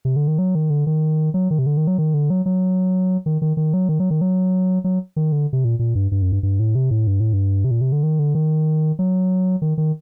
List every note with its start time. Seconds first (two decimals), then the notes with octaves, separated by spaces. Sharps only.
0.05 C3
0.16 D3
0.28 D#3
0.39 F#3
0.55 D#3
0.70 D3
0.87 D#3
1.34 F#3
1.51 D#3
1.59 C3
1.66 D3
1.77 D#3
1.87 F#3
1.98 D#3
2.14 D3
2.30 F#3
2.46 F#3
3.26 D#3
3.42 D#3
3.57 D#3
3.74 F#3
3.89 D#3
4.00 F#3
4.10 D#3
4.21 F#3
4.84 F#3
5.16 D#3
5.32 D3
5.53 C3
5.65 A#2
5.79 A#2
5.95 G2
6.12 G2
6.22 F#2
6.32 G2
6.43 G2
6.60 A2
6.75 C3
6.91 A2
7.07 G2
7.20 A2
7.33 G2
7.65 C3
7.71 A#2
7.81 C3
7.92 D3
8.03 D#3
8.19 D3
8.35 D#3
8.99 F#3
9.62 D#3
9.78 D#3